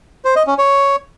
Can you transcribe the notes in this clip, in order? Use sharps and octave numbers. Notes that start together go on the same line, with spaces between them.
C5
D#5
C#4
C#5